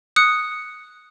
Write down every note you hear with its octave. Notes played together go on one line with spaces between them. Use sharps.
D#6 F#6 C#7